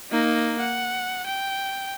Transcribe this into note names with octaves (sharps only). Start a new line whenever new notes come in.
A#3 D#4
F#5
G5